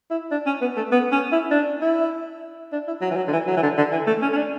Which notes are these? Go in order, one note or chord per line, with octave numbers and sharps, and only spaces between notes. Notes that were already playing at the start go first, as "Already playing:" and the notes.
E4
D4
C#4
B3
A3
B3
C#4
E4
D4
E4
D4
E4
F#3
E3
F#3
D3
E3
F#3
E3
D3
D3
E3
A3
C#4
C#4
D4